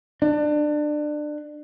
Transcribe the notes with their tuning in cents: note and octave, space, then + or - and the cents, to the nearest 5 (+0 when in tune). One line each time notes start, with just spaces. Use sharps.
D4 +25